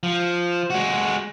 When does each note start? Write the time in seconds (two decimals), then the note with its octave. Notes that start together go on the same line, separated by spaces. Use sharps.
0.03 F3
0.70 G#3 F#4